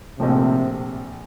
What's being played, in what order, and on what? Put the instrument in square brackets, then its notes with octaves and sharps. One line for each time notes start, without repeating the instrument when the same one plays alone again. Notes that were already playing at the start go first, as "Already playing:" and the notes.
[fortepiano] A#1 A2 F3 [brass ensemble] C3